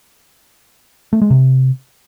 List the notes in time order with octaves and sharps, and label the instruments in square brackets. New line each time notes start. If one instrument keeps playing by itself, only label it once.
[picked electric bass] A3
G#3
C3